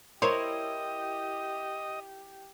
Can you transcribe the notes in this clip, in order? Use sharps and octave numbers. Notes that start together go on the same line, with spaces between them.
E4 G4 A#4 C5 C#5 D#5